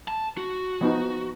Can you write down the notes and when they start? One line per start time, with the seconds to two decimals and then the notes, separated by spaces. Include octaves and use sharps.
0.08 A5
0.37 F#4
0.81 F3 B3 D#4